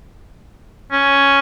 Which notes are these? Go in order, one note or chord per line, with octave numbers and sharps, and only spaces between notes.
C#4